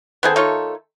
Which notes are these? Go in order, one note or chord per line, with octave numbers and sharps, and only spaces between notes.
D#3 A3 B3 C4 G#4 A4
D#4 F4 C#5